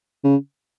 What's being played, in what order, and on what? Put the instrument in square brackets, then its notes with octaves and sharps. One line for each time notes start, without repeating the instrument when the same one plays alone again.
[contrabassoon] C#3